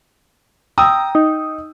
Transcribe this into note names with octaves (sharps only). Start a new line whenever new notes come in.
G5 A#5 D#6 E6
D#4